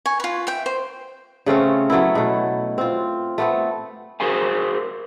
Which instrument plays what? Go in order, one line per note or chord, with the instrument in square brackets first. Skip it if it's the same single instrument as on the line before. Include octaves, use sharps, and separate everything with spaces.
[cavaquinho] G#5 C#6
F4 B4
E5 G5
C5
[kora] C#3 A3 C4 C#4
F#3 A3 B3 E4
B2 A3
C4 F4
A3 B3 C4
[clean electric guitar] F#4 G#4 A#4 C5 F5 G#5